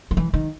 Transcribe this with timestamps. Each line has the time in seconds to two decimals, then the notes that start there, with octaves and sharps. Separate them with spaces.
0.11 D#3
0.17 E3
0.34 D#3